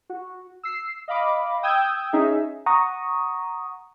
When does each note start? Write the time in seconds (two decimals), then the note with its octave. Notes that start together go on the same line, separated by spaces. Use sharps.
0.10 F#4
0.63 E6 C7
1.08 D#5 F5 B5 D6
1.63 G5 D#6 E6 G6 G#6
2.13 C#4 D#4 G#4 E5
2.66 F#5 A#5 C#6 D#6